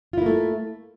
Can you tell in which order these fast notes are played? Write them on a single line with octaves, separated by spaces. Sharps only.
F4 E4 A#3 A3